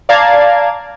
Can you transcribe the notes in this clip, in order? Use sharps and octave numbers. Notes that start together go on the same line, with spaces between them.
D5 F5 A5 A#5 D6 G#6